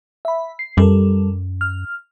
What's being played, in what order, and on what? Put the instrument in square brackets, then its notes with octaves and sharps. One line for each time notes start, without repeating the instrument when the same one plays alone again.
[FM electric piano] E5 B5
C7
[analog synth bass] F#2 [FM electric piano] G3 A4 A#4
[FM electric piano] F6